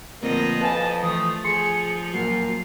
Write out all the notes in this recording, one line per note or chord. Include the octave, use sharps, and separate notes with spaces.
D2 A#2 F3 B3 C4 A#4 D#5
F2 B4 F5 G#5 A5
E3 F3 A3 D#6
F3 G#4 C6 C#7
F#2 A#2 F#3 A#4 C7